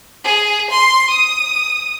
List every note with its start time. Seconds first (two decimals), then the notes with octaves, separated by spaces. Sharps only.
0.24 G#4
0.71 C6
1.10 D#6